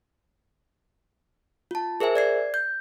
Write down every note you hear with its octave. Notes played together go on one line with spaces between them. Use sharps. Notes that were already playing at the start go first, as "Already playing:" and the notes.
F4 A5
G#4 A#4 C5 E5 G#5
D5 G#6 C7
G6